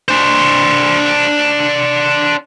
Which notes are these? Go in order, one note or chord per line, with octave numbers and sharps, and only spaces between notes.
D4 C5